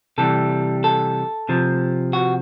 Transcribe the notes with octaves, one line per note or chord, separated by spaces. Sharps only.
C3 E3 G3 A4
A4
C3 F3
F#4